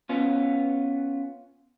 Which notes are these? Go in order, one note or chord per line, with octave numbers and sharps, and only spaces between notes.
B3 C#4 F4